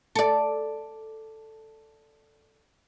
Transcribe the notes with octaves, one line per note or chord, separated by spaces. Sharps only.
A4 D5